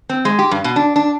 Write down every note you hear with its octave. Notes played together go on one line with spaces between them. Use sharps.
C4
G#3
G4
G2
B2
D4
D4